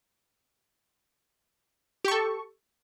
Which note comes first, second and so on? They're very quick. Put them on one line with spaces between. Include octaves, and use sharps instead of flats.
G4 C#6 A4